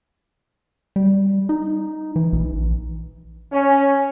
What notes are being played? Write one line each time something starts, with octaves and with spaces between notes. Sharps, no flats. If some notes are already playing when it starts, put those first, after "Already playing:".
G3
D#4
E3
A#1
C#4